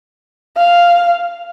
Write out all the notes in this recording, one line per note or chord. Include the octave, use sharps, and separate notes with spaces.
F5